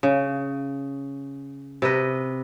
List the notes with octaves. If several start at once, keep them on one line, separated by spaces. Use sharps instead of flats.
C#3
C3 B4 D#5